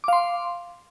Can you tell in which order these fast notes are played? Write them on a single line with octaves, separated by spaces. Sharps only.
D6 F5 C6